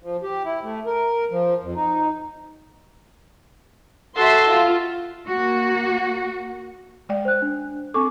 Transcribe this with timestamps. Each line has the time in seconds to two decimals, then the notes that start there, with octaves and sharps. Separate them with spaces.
0.02 F3
0.23 G4
0.45 E4
0.63 A3
0.86 A#4
1.31 F3
1.63 F2
1.75 D#4
4.17 F#4 A4 E5 C6
4.49 F4
5.27 A#3 F#4
7.09 G#3 D5 G5
7.25 C5 F#6
7.42 D4
7.94 C4 A4 C#6 D6